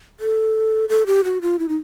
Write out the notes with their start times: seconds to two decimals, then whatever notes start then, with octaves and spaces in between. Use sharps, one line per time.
0.20 A4
0.89 A4
1.06 G4
1.24 F#4
1.42 F4
1.59 E4
1.69 D#4